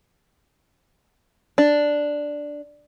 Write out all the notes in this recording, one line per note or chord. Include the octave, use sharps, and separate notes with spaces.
D4